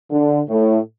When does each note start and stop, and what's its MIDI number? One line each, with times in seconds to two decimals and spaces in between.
0.11 0.39 50
0.49 0.78 45